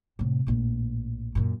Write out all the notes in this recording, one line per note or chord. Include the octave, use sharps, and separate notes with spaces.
A2 C3
A#1 A2
F#2 A#2